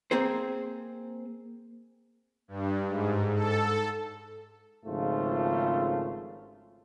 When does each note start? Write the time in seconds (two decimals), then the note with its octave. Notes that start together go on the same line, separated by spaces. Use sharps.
0.11 A#3 C4 G#4 C5
2.48 G2
2.88 G#2
3.35 A4
4.85 G#1 G#2 C#3 F3 A3 F4